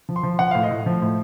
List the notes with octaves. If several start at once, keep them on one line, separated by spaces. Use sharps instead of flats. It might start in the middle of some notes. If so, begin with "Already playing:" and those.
F3
C6
F3
F3 F#5
A2 F5
D#5
A2
F3
A2